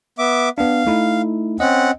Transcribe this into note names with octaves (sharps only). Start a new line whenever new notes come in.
B3 E5 D6
B3 D4 F5
A3 D#4 E4
C4 C#4 D#5 F#5